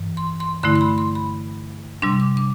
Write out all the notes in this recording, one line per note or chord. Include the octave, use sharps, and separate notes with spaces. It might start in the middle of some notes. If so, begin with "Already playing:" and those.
Already playing: G2 E3
C6
C6
G2 D3 A3 E4 C6
C6
B5
C6
B5
C3 G3 D4 C6
D6
D6